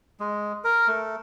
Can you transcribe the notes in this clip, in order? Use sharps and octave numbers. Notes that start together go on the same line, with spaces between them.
G#3
A#4
A3